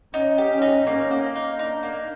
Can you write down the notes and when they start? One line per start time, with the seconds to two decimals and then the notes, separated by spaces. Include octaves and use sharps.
0.14 C#4 D#4
0.38 G4
0.51 C#4
0.62 D#4
0.86 A#3 C#4
1.11 A#3
1.36 D#4
1.59 D4 D#4
1.83 A#3